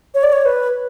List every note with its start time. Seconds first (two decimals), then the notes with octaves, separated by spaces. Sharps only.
0.15 C#5
0.23 D5
0.33 C#5
0.46 B4